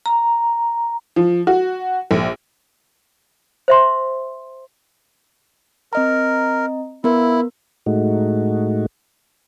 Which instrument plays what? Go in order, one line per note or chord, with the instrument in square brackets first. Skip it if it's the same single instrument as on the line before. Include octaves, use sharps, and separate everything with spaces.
[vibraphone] A#5
[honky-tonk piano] F3
F#4
A#1
[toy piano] C5 E5 C6
[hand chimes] C4 D#5 A#5 [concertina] A#4
[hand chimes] B3 A#4 [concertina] E4
[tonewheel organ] A2 G#3 A3 D#4 F#4